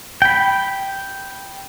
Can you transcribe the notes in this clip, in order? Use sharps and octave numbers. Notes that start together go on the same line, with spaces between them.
G5 B5